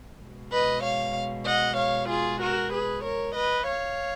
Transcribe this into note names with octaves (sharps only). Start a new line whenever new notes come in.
B2 G#3
B4 D#5
C#5 F5
D#5 F#5
C#5 F5
F4 G#4
F#4 A#4
G#4 B4
A#4 C#5
B4 D#5
C#5 F5